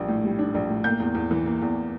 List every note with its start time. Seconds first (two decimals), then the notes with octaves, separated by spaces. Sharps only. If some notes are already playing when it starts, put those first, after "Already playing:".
Already playing: A#1 G3 D4
0.08 A2
0.24 G3
0.39 D4
0.54 A#1
0.69 A2
0.84 A#3 G6
1.00 E2
1.15 E2
1.31 E3
1.46 A#3
1.62 E2